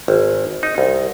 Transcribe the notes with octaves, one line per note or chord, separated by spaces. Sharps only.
G#1
D#4
C2